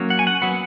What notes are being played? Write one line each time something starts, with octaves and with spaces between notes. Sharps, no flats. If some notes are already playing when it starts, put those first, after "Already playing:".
Already playing: F#3 A#3 C#4
F#5
G#5
F#5
F#3 B3 F#5